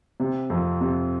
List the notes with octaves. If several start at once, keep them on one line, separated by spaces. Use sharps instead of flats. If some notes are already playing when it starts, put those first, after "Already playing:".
C3
F2
C3